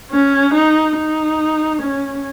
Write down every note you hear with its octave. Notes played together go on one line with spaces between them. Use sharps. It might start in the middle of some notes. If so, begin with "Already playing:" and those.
C#4
D#4
D#4
C#4